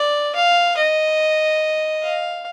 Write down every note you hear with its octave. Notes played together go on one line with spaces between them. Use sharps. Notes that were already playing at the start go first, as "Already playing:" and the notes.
Already playing: D5
F5
D#5
F5